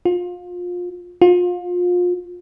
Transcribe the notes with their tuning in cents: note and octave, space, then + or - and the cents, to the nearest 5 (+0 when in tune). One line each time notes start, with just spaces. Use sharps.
F4 +25
F4 +30